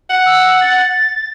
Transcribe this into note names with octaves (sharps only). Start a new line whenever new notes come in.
F#5
E6
A6